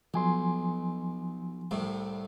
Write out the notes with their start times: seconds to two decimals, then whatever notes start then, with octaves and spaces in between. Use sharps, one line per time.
0.14 B1 F3 G#5 C6
1.71 C2 A2 C3